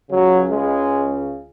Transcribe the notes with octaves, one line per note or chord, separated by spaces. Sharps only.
C#2 C#3 F#3
G#3